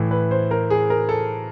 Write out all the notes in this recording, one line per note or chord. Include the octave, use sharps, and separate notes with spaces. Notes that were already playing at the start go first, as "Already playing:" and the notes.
Already playing: A2 E3
B4
C5
A#4
G#4
A#4
A4